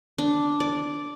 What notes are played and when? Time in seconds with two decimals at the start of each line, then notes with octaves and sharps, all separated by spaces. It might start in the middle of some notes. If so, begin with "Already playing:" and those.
0.18 D4
0.60 D5